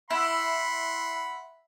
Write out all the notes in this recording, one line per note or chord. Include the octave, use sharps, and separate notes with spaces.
E4 F#5 B5 C6